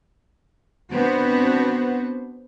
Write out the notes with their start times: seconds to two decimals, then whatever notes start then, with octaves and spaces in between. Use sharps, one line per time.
0.92 B3 C4 D4 F#4 B4 C5